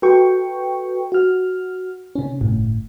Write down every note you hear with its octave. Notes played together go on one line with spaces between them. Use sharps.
F#4 A4 B4 G5 C#6
F#4 F6
C3 C#4
G1 A2